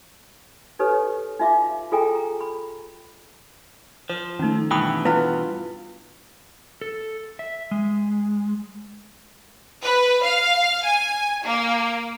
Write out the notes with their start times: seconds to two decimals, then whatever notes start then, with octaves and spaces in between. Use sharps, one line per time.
0.79 D#4 G4 A4 B4 C#5
1.40 D#4 F4 E5 F5 D6
1.92 F4 G#4 A4 G5 G#5 A#5
2.15 A#5
2.41 B5
4.10 F3 C5
4.39 D#3 A3 C#4 D#4
4.71 G2 B2 E3 G5 B5 D#6
5.05 B3 E4 F4
6.81 A4
7.39 E5
7.71 G#3
9.84 B4
10.24 F5
10.85 G#5
11.45 A#3